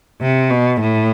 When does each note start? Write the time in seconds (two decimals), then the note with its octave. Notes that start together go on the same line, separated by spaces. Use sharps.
0.21 C3
0.51 B2
0.81 A2